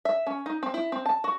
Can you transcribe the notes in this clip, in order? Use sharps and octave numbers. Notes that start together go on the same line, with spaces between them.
E5
C#4
D#4
C4
E4
C4
A5
F#4